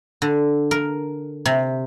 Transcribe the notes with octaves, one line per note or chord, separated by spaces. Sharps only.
D3
A#4
C3